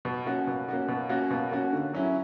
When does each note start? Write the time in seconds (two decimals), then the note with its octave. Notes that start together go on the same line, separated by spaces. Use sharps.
0.05 B2
0.26 A#3 C#4 F#4
0.47 B2
0.68 A#3 C#4 F#4
0.88 B2
1.09 A#3 C#4 F#4
1.31 B2
1.51 A#3 C#4 F#4
1.73 D3
1.93 F#3 C#4 E4